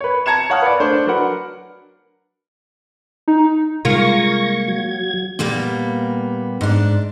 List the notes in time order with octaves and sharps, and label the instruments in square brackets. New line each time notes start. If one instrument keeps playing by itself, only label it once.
[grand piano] B4 C#5
A5 A#5 G#6 C#7 E7
C#5 F5 F#5 A5 D#6 F6
B4 D5
A3 D4 C5 C#5
F#3 D4 A#4 B4 F#5
[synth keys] D#4
[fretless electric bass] C3 G3 G#3 [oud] A#3 F4 [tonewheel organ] C#6 G#6 A#6
[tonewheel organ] F#3 G#6
[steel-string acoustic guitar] A#2 G3 A#3 B3
G#2 D4